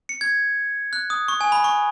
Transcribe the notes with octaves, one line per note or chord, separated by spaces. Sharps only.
C#7
G#6
F#6
D#6
C#6
G#5
B5
C#6